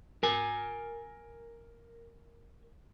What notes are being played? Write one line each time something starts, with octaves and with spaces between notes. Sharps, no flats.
A#4 G#5